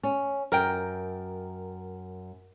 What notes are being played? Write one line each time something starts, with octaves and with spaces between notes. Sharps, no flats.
C#4
F#2 A#4 G5